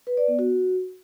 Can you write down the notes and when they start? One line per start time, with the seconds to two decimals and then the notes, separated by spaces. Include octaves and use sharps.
0.07 B4
0.17 D5
0.28 B3
0.39 F#4